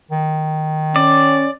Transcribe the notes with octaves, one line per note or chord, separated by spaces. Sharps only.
D#3
C#4 D5